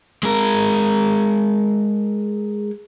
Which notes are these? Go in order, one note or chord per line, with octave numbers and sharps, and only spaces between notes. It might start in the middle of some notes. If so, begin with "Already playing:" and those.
G#3 A#4